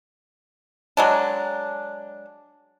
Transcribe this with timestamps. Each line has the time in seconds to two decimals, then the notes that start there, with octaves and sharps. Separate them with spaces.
0.97 F#3 G#3 D4